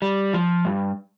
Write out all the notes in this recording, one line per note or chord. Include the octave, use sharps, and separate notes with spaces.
G3
F3
G2